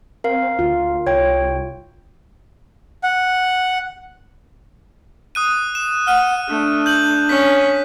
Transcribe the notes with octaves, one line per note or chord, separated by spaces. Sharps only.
C4 A#4 F5
D2 F4
C2 C#5 G5
F#5
D#6 F#6 D#7
E7
F#5 F6 D#7
A3 D4
G6 F#7
C#4 B6